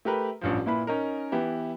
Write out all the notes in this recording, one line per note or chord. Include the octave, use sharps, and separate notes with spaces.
A3 G4 A#4 B4
A1 G2 F3
A#2 E4 B4 B5
C#4 D#4 A#4
E3 B3 E4 G4